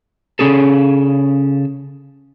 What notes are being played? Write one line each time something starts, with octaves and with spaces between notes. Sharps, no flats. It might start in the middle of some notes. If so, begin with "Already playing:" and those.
C#3 F3 C#4 G#4 A4